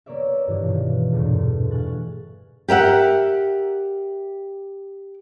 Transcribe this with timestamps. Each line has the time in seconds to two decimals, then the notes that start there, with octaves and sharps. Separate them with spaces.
0.06 A#3 B3 C#5 D5 E5
0.47 G2 E3 F4
0.62 B2 D#3
1.12 E1 G2 A#2 D3 A3
1.71 F5 G#5 C#6 F#6 A6
2.68 G4 A#4 E5 F#5